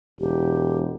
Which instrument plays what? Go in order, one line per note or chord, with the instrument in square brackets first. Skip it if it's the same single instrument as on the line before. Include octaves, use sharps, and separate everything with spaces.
[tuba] E1 [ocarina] G4